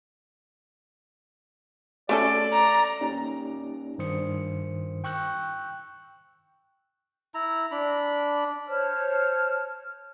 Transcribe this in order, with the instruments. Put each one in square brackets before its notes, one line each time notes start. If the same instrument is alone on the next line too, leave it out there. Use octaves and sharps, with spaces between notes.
[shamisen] A3 C#4 A4 [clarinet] D5
[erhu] A#5
[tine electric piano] A#3 C#4 D#4 G4 D5
G2 D#3 C5 D#6 C#7
G5 C#6 E6 F#6 G6
[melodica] E4 A#5
D4 B5
[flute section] C5 C#5 A5 F6